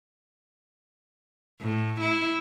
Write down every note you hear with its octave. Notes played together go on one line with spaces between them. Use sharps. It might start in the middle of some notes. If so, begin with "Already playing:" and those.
A2
E4